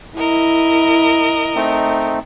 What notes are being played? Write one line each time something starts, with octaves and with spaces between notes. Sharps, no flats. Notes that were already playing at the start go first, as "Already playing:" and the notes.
E4 A#4 D#5
A3 C4 D#4